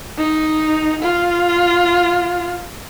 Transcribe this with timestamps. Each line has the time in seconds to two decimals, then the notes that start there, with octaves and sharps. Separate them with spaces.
0.18 D#4
1.02 F4